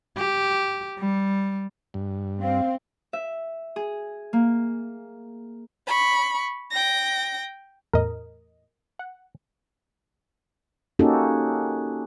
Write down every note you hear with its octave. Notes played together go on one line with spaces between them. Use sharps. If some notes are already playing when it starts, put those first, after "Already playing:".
G4
G3
G2
C4 F5
E5
G#4
A#3
B5 C#6
G5 A#6
E2 A2 A#4 D#5
F#5
A#3 C#4 D#4 F#4 G4 A4